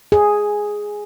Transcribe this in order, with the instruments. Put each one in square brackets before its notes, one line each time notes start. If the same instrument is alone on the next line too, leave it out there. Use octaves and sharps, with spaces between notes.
[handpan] G#4